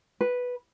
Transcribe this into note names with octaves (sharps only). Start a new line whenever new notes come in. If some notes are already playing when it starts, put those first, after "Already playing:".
B4